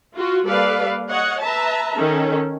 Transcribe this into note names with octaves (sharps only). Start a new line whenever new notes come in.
F4 F#4
G3 A#3 A4 B4 D5 F5
C#5 D#5 F#5
B4 E5 A5 A#5
D#3 C#4 A4